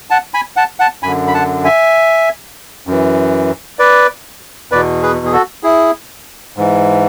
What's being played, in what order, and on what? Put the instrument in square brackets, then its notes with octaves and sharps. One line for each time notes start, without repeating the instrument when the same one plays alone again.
[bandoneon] F#5 A5
G#5 B5
F#5 A5
F#5 A5
F#2 D3 G#5 B5
B5
F#5 A5
E5 G#5
F#2 E3
B4 D5
E2 B2 B4 D5
G#4 B4
G#4
F#4 A4
E4 G#4
G#2 E3